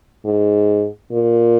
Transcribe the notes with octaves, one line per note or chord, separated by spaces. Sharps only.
G#2
A#2